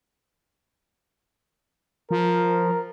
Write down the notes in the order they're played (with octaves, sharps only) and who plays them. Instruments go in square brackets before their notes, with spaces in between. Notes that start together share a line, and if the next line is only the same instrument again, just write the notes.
[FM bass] F3 [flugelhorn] A#4